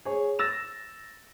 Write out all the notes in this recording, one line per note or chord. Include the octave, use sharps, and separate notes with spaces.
G#4 C#5
E6 A6 A#6 E7